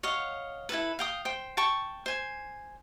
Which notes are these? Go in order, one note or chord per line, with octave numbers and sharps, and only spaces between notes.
C#5 D#5 F5 F#5
E4 F#4 A4 B4
F5 G5 D#6
C5 G5
G5 A5 C#6
C5 G#5